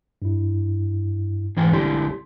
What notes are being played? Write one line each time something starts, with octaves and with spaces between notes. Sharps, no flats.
G2 E4
G#2 E3 G5
A#1 D3 G3 E4 G4 C6